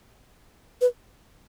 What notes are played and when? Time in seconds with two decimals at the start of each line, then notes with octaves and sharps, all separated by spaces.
0.81 B4